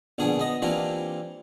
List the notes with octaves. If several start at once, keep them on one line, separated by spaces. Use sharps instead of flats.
A#1 B2 D3 D4 G#4 D#6
B3 D#5
C3 E3 G3 A#3 D4 F4